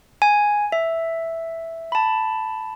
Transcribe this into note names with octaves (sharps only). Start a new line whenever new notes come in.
G#5
E5
A5 B5